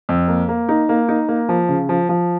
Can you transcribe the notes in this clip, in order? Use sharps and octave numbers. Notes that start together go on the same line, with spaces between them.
F2
A#3
A#3
D#4
A#3
D#4
A#3
F3
C#3
F3
F3